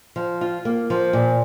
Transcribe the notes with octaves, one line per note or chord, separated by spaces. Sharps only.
F3
F4
A#3
F3
A#2